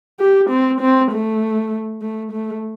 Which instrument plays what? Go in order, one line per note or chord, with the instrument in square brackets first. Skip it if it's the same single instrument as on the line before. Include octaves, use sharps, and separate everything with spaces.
[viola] G4
C4
C4
A3
A3
A3